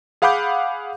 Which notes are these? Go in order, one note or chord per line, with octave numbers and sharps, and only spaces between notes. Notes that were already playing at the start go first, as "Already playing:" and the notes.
G#4 F5 F#5 B5 D6 G6